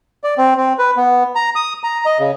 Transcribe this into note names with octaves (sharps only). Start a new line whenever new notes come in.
D5
C4
C4
B4
B3
A#5
D#6
A#5
D#5
C#3